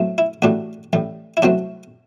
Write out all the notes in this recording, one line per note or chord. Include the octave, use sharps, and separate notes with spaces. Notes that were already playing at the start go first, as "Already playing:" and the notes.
Already playing: A2 F#3 A3 C4
E4
A1 A2 G3 D4 F#4
A1 A2 G3
E4
C2 C3 F#3 A3 C4 D4 F#4